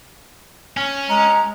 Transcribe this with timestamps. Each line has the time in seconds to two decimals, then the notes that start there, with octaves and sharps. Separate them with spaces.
0.77 C#4
1.09 G#3 A#5